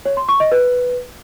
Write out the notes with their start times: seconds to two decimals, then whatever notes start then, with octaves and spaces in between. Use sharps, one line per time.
0.05 C#5
0.17 C6
0.29 C#6
0.40 D#5
0.52 B4